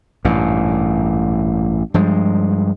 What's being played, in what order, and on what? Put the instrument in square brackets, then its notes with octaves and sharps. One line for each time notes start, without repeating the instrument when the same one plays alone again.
[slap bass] A1 G2 A#2
G2 F3 G#3